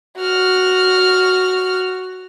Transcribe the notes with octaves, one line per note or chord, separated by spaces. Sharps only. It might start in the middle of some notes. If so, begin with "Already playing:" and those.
F#4 F6